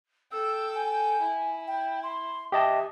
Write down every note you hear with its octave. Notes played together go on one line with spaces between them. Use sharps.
A4 G5 E6
G#5
E4
G5
C6
G4 D#5 E5 A5